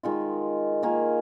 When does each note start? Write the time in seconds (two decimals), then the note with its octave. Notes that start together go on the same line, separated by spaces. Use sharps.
0.03 D#3 G#3 F4
0.83 D#3 A#3 F4 G#4